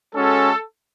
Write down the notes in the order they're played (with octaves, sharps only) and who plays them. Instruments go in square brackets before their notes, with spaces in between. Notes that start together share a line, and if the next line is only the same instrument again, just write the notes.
[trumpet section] G#3 C#4 F#4 A4